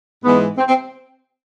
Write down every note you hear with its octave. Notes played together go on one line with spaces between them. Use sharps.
G#2 E3 G#3 B3
C4
C4